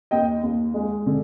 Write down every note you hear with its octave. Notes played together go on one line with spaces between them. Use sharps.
D#2 D#5 G5
D#2
G#3
D3